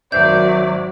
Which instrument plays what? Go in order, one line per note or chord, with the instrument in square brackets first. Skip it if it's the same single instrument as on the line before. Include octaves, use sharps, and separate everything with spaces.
[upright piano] G#1 C5 E5 [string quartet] F#3 [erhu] D5 [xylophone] G6